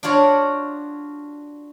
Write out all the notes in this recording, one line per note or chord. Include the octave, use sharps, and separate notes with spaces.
D4 F4 F#4 C#5 D5